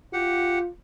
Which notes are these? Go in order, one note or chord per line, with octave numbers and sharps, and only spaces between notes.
F4 G4 F#5